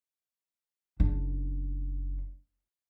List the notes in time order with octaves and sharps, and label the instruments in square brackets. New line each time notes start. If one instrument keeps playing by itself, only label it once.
[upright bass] F#1 D4